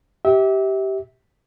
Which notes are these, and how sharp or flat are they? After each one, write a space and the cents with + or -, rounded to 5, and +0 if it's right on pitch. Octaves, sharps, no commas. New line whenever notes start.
G4 -15 E5 -30